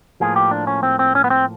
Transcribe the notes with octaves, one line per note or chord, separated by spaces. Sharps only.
A2 F3 A#3 G#4
G4
D4
C#4
C4
C4
C#4
B3
C4